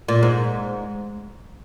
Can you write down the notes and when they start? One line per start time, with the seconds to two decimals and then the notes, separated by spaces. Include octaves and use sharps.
0.08 A#2
0.23 G#2